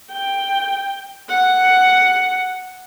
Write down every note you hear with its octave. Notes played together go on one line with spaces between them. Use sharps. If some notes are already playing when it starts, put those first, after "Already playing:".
G5
F#5